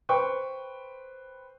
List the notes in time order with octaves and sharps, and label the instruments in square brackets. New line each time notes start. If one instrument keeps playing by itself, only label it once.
[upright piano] B4 C5 G5 C#6